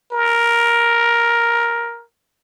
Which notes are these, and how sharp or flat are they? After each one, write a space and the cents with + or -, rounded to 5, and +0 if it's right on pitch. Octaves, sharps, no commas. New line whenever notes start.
A#4 +10